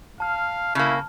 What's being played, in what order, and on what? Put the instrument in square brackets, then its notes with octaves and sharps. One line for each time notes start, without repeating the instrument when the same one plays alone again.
[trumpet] F5 [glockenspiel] A5 F6
[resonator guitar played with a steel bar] C#3 A#3 [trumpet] E4